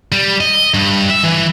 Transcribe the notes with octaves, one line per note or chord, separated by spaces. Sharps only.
G3
D#5
G2
E5
E3